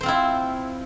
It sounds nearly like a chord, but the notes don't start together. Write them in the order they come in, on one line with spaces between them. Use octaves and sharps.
C5 C4 F4 E4